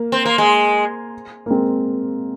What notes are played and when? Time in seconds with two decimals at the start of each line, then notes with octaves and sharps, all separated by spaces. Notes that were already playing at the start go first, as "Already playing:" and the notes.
Already playing: A#3
0.12 C4
0.25 A#3
0.38 G#3
1.46 A#3
1.50 G#3 C4